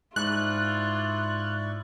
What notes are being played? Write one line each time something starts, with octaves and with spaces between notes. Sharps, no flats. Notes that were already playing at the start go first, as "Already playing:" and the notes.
G#2 E4 F4 D5 C#6 F#6